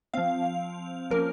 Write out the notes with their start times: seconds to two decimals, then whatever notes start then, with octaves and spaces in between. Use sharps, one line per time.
0.14 F3 C4 F5
1.11 F3 A#3 C#4 A#4